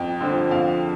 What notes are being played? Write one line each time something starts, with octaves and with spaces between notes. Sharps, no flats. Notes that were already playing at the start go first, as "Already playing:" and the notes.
Already playing: F2 G5
D3 F3
F2 F5